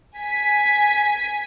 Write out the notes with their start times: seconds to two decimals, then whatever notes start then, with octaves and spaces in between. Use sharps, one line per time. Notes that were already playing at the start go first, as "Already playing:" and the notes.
0.17 G#5 B6